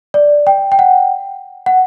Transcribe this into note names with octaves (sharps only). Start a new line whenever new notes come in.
D5
G5
G5
F#5
F#5